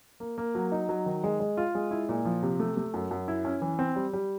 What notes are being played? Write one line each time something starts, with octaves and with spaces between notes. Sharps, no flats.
A#3
A#3
F#3
D#4
F#3
D#3
G#3
G#3
F4
G#3
E4
A#2
F3
C3
A3
A3
F#2
F#2
E4
C#4
E3
C4
G3
G3